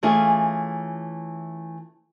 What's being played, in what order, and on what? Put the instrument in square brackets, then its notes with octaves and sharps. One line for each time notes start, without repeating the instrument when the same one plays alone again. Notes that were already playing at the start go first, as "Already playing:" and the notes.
[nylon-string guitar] E3 A3 C#4 F4 G#4